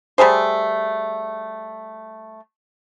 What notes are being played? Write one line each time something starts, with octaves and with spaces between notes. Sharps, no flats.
G3 A3 G#4 C5